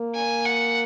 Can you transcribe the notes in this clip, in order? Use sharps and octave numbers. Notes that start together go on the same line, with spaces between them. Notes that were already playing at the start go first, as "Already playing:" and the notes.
Already playing: A#3
G#5
F#5